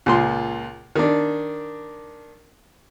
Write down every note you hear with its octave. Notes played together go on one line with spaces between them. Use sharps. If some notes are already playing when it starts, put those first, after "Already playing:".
C#2 A#2 C6
D#3 D4